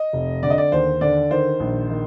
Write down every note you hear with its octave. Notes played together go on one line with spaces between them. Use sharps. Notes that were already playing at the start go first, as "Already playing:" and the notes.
Already playing: D#5
F1
D3 D5
D#5
D5
D#2 C5
D3 D5
D#3 C5
A#1
D#3